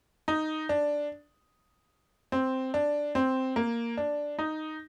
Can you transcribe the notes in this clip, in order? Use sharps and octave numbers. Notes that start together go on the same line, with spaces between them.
D#4
D4
C4
D4
C4
A#3
D4
D#4